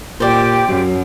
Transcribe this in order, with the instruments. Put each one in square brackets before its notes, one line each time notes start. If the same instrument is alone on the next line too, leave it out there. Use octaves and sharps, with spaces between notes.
[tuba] A#2 [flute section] G4 G5 [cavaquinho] C5 D5
[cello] F#2 [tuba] F#3